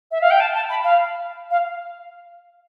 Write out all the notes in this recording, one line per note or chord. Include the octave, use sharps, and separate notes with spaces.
E5
F5
G5
A5
A5
B5
F5
F5